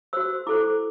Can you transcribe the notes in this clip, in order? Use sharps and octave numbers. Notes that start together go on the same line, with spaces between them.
F#4 C5 E6
E4 A4 C5 D6